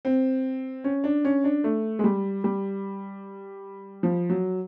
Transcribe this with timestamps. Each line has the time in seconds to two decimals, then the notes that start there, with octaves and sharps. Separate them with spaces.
0.05 C4
0.84 C#4
1.04 D4
1.25 C#4
1.44 D4
1.64 A3
1.99 G#3
2.04 G3
2.44 G3
4.03 F3
4.29 F#3